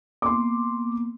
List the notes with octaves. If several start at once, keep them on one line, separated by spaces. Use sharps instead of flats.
A#3 B3 C6 D6